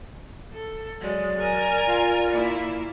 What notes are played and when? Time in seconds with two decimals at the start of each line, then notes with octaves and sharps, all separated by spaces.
0.53 A4
1.02 F#3 G#3 D5
1.40 A#4 G#5
1.88 F4
2.31 A#3 E4